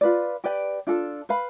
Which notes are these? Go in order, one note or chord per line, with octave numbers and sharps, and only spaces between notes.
F4 B4 D5
G4 B4 D5 G5
D4 F4 A4
B4 F5 B5